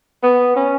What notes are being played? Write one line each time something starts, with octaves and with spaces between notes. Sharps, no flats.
B3
C#4